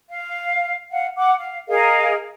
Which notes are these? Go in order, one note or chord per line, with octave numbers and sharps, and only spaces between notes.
F5
F5 F#5
F#5 D6
F5
G#4 A#4 D#5 F5